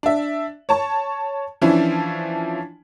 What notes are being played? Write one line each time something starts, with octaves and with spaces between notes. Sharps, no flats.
D4 E5
C#5 A5 C#6
E3 F3 C#4 D4 E4